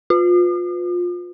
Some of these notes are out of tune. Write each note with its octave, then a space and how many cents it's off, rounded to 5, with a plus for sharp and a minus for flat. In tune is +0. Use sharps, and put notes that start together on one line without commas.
F4 +25